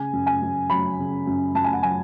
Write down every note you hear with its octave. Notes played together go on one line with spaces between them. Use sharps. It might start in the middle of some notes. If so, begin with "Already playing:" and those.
Already playing: C#3 G#5
F#2
G#5
F#2
F#3 B5
C#3
F#2
F#2 A5
G#5
F#5
F#3 G#5